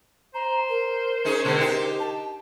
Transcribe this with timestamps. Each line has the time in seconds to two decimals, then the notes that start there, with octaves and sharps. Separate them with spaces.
0.35 C5 A#5
0.69 A#4
1.25 C#4 D#4 G#4
1.44 B2 D3 G#3
1.60 D#4 G4
2.00 A5